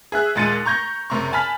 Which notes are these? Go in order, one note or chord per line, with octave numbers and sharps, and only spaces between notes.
G#4 E5 F#6
D#2 A#2 G#3 A6 C#7 D#7
A#5 C#6 G6 G#6 A#6
F#1 C3 A#5 C#6
G#5 A5 B5 F6 B6